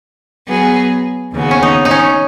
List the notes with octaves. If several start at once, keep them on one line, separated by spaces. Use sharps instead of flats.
F#3 B3 G#4
D#2 C#3 B3 F#4
C#4
D#4
D#4
C#4